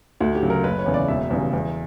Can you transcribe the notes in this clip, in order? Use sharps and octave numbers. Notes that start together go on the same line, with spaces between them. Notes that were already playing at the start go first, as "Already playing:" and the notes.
D2 F#4
G4
C#3 F#3
A#4
F#1 B4
C#5
E2 C#3
D5
E1 E5
E2 C#3 G3
E2